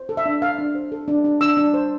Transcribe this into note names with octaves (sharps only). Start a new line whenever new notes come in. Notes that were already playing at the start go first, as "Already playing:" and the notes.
Already playing: C5
A4
E5
D4
A4 F5
D4
C5
A4
D4
D4
D4 E6
D4
C5